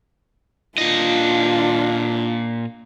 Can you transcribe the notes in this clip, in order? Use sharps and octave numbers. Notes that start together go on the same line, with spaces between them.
A#2 D4 F4 D#5